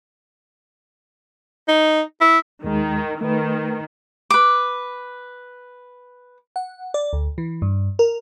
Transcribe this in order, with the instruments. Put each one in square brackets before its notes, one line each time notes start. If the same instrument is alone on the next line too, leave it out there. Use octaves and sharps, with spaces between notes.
[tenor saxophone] D#4
E4
[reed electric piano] D#2 G#3 [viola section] D#3
[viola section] D#3 [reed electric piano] A3 B4
[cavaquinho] B4 D6
[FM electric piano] F#5
D5
D2
E3
G2
A#4